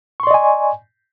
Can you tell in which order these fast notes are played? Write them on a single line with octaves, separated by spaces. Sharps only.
C#6 C6 D5 D#5 G#5